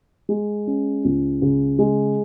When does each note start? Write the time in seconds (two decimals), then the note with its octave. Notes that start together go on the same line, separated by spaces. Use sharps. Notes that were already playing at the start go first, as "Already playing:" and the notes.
0.29 G#3
0.67 C#4
1.05 C#2
1.42 C#3
1.79 G#3